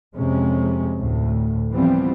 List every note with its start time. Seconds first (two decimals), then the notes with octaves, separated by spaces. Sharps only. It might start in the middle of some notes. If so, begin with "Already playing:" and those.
0.14 F2 C3 G#3 C#4
0.98 D2 A2
1.73 E3 F3 G3 B3 C4